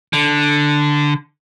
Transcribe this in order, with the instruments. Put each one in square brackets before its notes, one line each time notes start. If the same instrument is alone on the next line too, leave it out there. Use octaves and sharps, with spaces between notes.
[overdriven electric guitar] D3